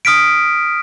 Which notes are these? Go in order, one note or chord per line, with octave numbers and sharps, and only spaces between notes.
D#6 F6 B6 D7